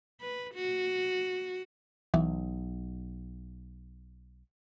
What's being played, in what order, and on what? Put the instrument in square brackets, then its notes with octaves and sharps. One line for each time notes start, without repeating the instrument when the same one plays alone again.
[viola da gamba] B4
F#4
[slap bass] B1 [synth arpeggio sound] E3